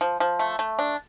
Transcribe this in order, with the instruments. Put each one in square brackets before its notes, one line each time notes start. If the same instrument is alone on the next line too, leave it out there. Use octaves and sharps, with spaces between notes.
[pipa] F3
F3
A3
A3
D4